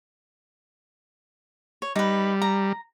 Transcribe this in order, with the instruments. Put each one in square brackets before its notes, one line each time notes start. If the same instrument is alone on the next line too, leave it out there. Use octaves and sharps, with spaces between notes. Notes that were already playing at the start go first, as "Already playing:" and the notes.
[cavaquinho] C#5
[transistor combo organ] G3 [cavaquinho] D#4 B4
[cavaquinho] A#5